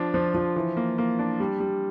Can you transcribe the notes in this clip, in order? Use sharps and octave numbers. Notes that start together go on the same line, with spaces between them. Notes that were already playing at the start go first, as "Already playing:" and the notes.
Already playing: F3 D4 F4
F3
F3
E3
A#3
A#3
D4
G3
G3